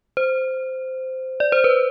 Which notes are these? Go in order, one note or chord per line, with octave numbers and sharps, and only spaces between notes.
C5
D5
C5
B4